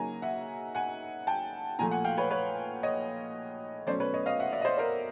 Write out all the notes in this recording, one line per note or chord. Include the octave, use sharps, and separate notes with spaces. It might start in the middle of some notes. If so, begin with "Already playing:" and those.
Already playing: C#3 F#3 A#3 D#4 G#5 A#5
E5 F#5
F#5 G#5
G5 A5
A#2 F3 A3 G#5 A#5
F#5 G#5
F5 G5
B4 C#5
B4 C#5
C#5 D#5
B2 F#3 A3 C#4 C5 D5
B4 C#5
C#5 D#5
D#5 F5
E5 F#5
D5 E5
D#5
C5 D5
A#4 C5